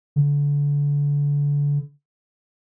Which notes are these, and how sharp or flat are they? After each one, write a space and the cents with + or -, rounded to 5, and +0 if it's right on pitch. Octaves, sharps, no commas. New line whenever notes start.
D3 -30